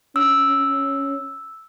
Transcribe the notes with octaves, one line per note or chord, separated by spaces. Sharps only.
C#4 E6